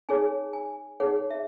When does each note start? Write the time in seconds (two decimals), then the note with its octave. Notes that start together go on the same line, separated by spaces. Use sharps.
0.09 D#4 G#4 C#5 G#5
0.53 G#5
1.00 D#4 G#4 C#5 F#5
1.30 E5